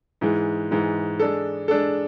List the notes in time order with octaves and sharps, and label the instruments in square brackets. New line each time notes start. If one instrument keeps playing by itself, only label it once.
[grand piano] G#2 E3 G#3
G#2 E3 G#3
G#3 D4 A4
G#3 D4 A4